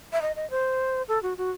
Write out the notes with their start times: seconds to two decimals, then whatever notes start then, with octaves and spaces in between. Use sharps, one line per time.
0.12 E5
0.22 D#5
0.36 D#5
0.50 C5
1.08 A4
1.23 F#4
1.38 F#4